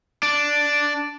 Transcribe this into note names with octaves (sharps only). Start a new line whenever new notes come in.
D4